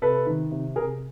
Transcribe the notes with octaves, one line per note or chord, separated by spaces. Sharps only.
C3 A4 B4
D#3
C3
C3 G#4 A#4